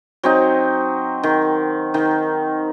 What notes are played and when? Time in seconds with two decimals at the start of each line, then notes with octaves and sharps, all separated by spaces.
0.23 F#3 C4 D#4
1.23 D#3
1.94 D#3